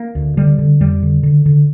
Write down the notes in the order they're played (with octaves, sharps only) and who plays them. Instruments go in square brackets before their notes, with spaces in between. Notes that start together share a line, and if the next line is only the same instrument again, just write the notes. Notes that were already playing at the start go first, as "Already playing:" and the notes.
Already playing: [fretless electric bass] A#3
D2
D3 G3
D3
F2 G3
D3
D3
D3